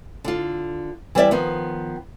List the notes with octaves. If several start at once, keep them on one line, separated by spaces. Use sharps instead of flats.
D3 F4
E3 G3 G4 B4 D5 E5
D#3 F3 B3